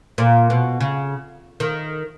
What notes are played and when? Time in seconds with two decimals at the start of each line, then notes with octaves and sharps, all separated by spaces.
0.18 A#2
0.50 B2
0.81 C#3
1.60 D#3